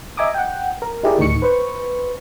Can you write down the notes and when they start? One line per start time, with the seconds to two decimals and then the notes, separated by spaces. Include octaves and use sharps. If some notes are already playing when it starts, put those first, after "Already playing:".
0.17 D#5 E5 G#5 A#5 D6 D#6
0.34 F#5 G5
0.82 A#4
1.03 D#4 E4 G4 G#4 A#4 D5
1.18 D2 A2 D#3 D#4 C#6 C#7
1.42 B4 C5 C#6